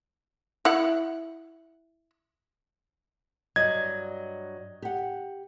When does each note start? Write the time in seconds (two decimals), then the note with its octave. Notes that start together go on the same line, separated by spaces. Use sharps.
0.65 E4 F#5
3.56 G2 F#3 D#5 G#6
4.82 G4 F#5